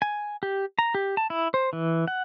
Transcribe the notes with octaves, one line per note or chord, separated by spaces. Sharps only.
G#5
G4
A#5
G4
A5
E4
C5
E3
F#5